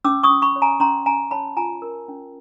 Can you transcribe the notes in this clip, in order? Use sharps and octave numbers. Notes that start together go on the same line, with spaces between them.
C#4 D6 E6
C#6 D#6
C#4
B5 C#6
C#5
G#5 A#5
C#4 A#5 C6
C#4 G#5 A#5
C#5 A5 B5
F4 G#5 A#5
A#4
C#4